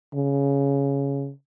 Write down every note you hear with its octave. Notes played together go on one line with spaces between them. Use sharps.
C#3